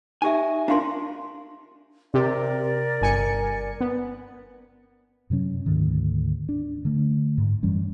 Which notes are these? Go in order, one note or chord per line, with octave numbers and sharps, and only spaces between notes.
D#4 G4 D#5 E5 G#5
D4 D#4 F4 A#4 F5 C6
C3 G4 A#4 D5
G1 G#5 C#7
B3
F#2 C3 F#3 C#4
D2 G#2 D#3
D4
D3 A3
G#2
F#2 E3 G3 C#4